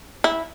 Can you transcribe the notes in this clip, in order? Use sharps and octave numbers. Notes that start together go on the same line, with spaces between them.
E4